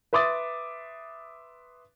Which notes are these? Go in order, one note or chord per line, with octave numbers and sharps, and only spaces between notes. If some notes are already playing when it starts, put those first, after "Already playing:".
B4 E5 C6 D6 D#6 A6